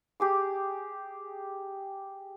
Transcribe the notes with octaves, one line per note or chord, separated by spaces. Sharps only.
G4 G#4 D6